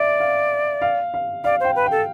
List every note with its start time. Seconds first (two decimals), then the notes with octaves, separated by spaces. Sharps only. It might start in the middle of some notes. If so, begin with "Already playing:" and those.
Already playing: D5 E5
0.20 F5
0.82 F5
1.14 F5
1.44 D5 F5
1.60 C5 G5
1.76 B4
1.86 G5
1.91 A4